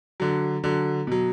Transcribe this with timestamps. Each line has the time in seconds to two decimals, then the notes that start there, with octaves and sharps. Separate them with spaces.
0.20 D3 F#3
0.64 D3 F#3
1.07 B2 F#3